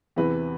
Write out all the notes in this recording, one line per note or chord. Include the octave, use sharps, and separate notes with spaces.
E2 C3 E3 B4